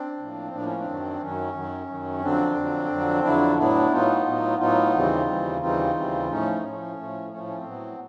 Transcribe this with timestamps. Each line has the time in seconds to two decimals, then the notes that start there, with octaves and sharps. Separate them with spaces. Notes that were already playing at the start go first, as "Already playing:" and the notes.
Already playing: C4 D4
0.18 A2 F3 A#3
0.52 A2 F3 A#3 D4
0.66 C#4
0.79 C4 D4
0.86 F#2 D#3 F#3
1.19 F#2 D#3 F#3 C#4
1.53 F#2 D#3 F#3
1.87 F#2 D#3 F#3
2.21 F2 D3 F#3 C4 D4
2.56 F2 D3 F#3
2.90 F2 D3 F#3
3.23 F2 D3 F#3 D4 E4
3.57 A2 F#3 B3 D4 E4
3.91 A2 F#3 B3 D#4 F4
4.26 A2 F#3 B3
4.58 A2 F#3 B3 D#4 F4
4.93 D#2 C#3 E3 G3 C4
5.26 D#2 C#3 E3 G3 C4
5.60 D#2 C#3 E3 G3 C4 D#4 F4
5.94 D#2 C#3 E3 G3 C4
6.28 A2 F3 A3 C#4 D#4
6.62 A2 F3 A3 C#4
6.96 A2 F3 A3
7.30 A2 F3 A3 C#4
7.47 C#4
7.56 C4
7.64 A2 F#3 B3